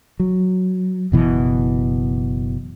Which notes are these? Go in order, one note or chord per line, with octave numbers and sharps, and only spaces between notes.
F#3
F#1 B2 E3